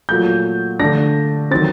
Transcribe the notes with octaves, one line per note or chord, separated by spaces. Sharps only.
A#2 F#3 A3 G6
D3 A3 D4 A#6
D#3 F#3 C4 A6